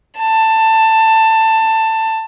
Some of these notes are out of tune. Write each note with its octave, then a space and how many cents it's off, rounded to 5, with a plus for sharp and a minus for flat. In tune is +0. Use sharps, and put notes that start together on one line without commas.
A5 +15